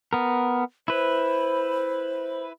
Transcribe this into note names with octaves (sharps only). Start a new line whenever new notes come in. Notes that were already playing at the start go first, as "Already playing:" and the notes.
B3 A#4
E4 B4 C5